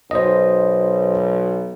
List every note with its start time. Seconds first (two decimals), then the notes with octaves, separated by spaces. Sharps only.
0.11 B1 C5 D#5